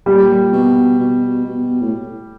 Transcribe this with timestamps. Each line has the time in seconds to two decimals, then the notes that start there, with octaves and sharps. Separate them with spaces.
0.06 A#2 G3
0.53 B2
0.99 B2
1.44 B2
1.81 A2